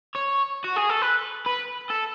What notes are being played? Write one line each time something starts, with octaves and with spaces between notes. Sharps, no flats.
C#5
F#4
G#4
A4
B4
B4
A4